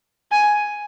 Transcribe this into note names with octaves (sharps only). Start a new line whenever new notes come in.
G#5